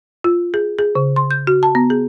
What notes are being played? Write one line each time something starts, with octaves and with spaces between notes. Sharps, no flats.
F4
G#4
G#4
C#3
C6
G6
F#4
A5
B3
G#4